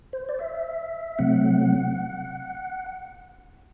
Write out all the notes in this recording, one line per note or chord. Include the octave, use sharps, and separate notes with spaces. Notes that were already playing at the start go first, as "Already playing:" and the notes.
C5
D5
E5
C3 F#3 A3 C4 F#5